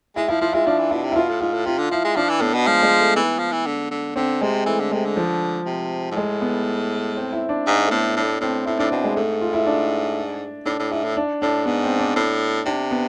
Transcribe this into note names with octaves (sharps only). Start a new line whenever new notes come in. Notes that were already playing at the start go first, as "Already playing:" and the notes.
G#3 E4
F3 E4
F3 F4
G#3 E4
F3 D4
E3
B2 E4
C3
E4
B2 F4
A2
G#2 F4
A2
C3 F4
D3
F3 E4
G#3
F3 D4
E3
A2 B3
B2
F3 G#3
G#3
A3
E3 B3
F3
E3
D3
D3
D3 C4
C3 G#3
E3 A3
D3
C3 G#3
D3
F3
C3
G#2
A2 G#3
B3
C4
E4
D4
G#2
A3
A2 B3
A2 D4
A2 C4
A2 E4
A2 D4
B2 C4
G#3
G#2 A3
F4
E4
D4
A2 D4
A2
G#2 E4
A2
D4
A2 D4
G#2 B3
C4
D4
A2
C3 D4
B3